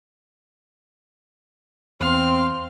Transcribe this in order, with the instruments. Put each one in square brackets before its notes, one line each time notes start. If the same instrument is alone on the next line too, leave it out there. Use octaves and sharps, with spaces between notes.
[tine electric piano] E2 [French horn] C4 [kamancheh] F5 F6 [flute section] C6